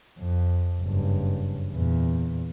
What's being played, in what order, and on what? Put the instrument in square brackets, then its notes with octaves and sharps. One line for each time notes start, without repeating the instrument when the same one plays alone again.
[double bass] F2
F#1 G2
E2 A#2